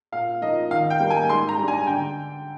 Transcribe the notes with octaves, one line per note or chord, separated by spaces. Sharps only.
A#2 F5
F3 A#3 D#4 D#5
D#3 F5
G5
G3 A#3
G#5
G#2 C6
A#5
G3 D4
G#5
D3 G5